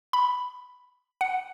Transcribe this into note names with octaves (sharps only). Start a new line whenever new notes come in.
B5
F#5